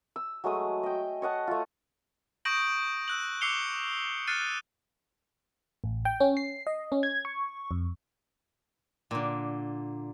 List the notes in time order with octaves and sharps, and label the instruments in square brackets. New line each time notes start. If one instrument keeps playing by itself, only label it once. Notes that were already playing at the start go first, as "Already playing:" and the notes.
[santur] E6
F#3 G#3 A3 D#6
D#5 G5
C#5 D#5 F#5 A5
A3 F4
[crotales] C#6 D#6 G6 A#6 D7 F#7
E6 F#6 F#7
D6 E6 C7 C#7 F7 G7
F6 F#6 A6 C7 C#7 D#7
[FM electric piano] A1
G5
C#4
C7
D#5
C#4
G#6
C#6
F2
[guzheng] A#2 D3